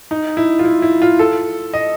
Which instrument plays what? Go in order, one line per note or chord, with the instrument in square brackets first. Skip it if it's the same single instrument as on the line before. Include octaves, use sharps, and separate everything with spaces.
[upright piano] D#4
E4
F4
E4
E4
F4
A4
D#5